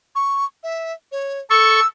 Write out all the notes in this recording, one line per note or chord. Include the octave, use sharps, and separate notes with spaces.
C#6
E5
C#5
A4 C#6 E6